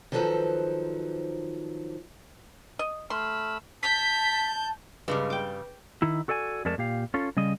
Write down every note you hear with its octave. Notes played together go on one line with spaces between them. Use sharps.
D#3 F3 F#3 A4 B4 C5
D#5
A3 B5 C6 E6 F6
A5 G6 B6
G2 C#3 G3 G#3 B4
G5 D6
D#3 D#4 E4
F#4 A4 D5 G5 G#5
F2 G#3 A3 A#4 D5 A5
A#2 G4 F5
C#4 F4 A4
C#3 G3 D#5